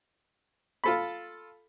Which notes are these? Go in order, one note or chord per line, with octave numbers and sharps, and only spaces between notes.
F4 A4 B5